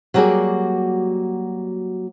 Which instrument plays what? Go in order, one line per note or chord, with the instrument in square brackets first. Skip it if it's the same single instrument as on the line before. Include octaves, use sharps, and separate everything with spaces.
[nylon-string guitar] F#3 G3 A#3 F#4 G#4 D5